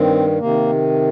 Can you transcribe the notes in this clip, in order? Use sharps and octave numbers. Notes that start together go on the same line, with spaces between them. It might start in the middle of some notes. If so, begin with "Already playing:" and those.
Already playing: G2 D#3 C4
C3 D#3 A#3